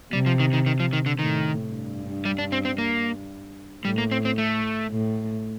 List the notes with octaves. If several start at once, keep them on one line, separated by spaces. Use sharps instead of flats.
C3 G3
F3
D#3
D#3
D#3
F3
D#3
D3
A2 D#3
G2
G3
D4
C4
C4
A#3
A2 G3
A#3
C4
C4
A3
A2